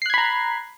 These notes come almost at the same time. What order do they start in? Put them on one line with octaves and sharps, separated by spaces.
C7 F#6 G#6 B5 A#5